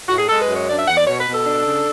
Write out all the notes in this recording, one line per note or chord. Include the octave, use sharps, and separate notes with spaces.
A2 F#4
G#4
G#3 A4
B4
F#2
C#5
D4 D5
E5
E2 F#5
D5
B2 C#5
B4
B2
A4
D4
C#3